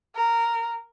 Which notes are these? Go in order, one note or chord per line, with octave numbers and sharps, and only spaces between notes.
A#4